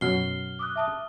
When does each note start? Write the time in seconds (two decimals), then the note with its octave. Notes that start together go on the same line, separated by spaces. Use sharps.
0.01 F#2 B2 F#3 F6 C7 G7
0.59 D6 D#6 F#6
0.76 E5 A5 D#6